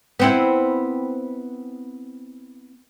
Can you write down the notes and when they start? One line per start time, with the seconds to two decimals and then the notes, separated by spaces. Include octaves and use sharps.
0.19 B3 C4 E4